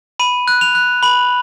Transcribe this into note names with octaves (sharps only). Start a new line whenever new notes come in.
B5 D#7
F#6
F7
F#6
B5 F#7